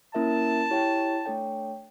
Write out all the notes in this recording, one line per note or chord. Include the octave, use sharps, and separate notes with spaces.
A#3 C#4 E4 A#4 E5 A5
E4 G4 C#5 G5
A3 D4 A4 C#5 G5